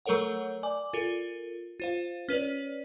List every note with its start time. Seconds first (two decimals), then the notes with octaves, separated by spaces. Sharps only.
0.06 F#3 A3 A4 A#4 C#5 F#5
0.63 D5 G#5 D6
0.93 F4 A4 A#4
1.80 F4 C5 F5
2.29 C#4 B4 C#5 D5